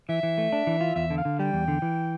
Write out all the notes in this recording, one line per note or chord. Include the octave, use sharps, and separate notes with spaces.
E3 E5
E3
A3
D4
E3
F4
E2 E5
D3
F5
D3
G3 G5
E2
D3
E3